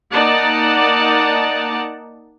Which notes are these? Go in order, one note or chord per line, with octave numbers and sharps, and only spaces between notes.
A#3 D#4 D5 F#5 A5